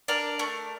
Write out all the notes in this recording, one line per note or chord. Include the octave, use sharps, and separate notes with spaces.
D4 A#4
A3